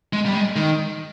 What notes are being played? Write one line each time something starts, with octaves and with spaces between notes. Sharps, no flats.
G#3
G3
G#3
D#3